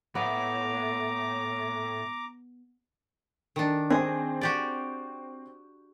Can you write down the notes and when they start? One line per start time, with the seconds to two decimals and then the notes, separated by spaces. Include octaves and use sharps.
0.15 A2 B3 A#5 D6
3.56 D#3 D4
3.90 C4 G#4 C5
4.41 F#4 G4 D5